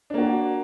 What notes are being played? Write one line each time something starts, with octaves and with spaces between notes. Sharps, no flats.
A#3 D4 F#4